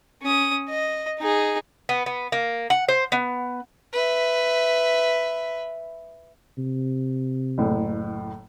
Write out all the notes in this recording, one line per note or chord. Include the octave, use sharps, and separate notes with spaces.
C#4 D#6
D#5
D#4 G#4
B3
B3
A#3
F#5
C5
B3
B4 E5
C3
F#1 A2